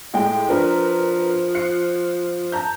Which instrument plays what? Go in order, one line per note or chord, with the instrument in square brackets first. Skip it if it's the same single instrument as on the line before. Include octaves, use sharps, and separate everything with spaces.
[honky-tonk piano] A2 G#3 G5
[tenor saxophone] F3 [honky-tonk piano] D4 A#4 B4
[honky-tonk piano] F#6 C7 C#7
A5 A#5 G6